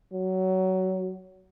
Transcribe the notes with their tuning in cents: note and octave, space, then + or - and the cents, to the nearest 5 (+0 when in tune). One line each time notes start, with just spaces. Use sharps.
F#3 +20